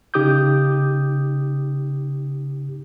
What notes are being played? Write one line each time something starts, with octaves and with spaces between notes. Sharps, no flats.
C#3 D#4 G4 D6 D#6 G6